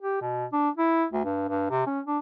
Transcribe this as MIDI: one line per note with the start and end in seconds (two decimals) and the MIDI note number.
0.01 0.20 67
0.22 0.45 47
0.53 0.69 62
0.77 1.06 64
1.13 1.24 38
1.24 1.47 43
1.49 1.66 43
1.70 1.85 48
1.87 2.00 61
2.07 2.19 62